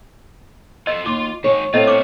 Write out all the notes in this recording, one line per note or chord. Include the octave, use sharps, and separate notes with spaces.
F4 A4 D#5 E6
D#2 F4 C6 D6
D#3 G#3 C#5
A2 C4 F4 D#5
C#4 D4 D6